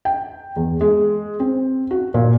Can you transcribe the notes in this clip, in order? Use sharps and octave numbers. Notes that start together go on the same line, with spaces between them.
G5
E2
G#3
C4
F#4
A#2